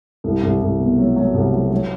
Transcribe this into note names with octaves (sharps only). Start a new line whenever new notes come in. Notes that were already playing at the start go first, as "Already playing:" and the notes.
C2
C2
C2
B2
F#3
F#3
C2
F#3
F#3